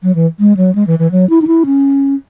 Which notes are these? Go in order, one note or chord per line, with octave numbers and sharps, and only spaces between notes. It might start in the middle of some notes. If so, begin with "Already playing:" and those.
F#3
E3
G#3
F#3
G#3
E3
E3
F#3
E4
D#4
E4
C#4